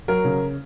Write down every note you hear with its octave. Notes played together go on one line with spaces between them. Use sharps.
F#3 A#4
C#3